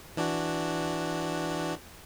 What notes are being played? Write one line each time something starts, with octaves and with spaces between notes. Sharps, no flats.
E3 D4 F#4